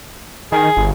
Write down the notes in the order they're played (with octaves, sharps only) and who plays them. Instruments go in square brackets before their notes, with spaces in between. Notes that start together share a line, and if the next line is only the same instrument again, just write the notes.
[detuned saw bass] D#3 [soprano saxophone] G#4
[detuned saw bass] G1